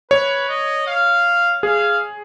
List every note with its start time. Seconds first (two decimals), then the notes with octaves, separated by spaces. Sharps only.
0.11 B4 C#5
0.49 D#5
0.87 F5
1.63 G#4 F5